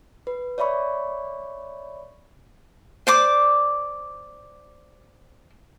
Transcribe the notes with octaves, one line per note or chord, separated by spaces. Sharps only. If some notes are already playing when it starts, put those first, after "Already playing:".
B4
C#5 D5 E5 B5 C#6
C5 D5 D6